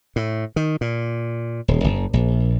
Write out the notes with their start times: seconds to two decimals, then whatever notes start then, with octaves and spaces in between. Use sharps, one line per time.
0.16 A2
0.56 D#3
0.81 A#2
1.68 D#1
1.84 F#1
2.13 A#1